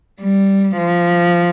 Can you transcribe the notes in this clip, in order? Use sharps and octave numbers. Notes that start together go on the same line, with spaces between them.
G3
F3